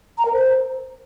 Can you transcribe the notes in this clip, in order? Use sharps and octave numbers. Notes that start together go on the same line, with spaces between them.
A#5
A#4
C5